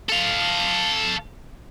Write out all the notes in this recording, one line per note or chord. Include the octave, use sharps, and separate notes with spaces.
A4 F5